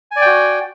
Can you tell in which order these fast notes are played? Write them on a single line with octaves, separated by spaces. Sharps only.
G#5 D5 G5 F#4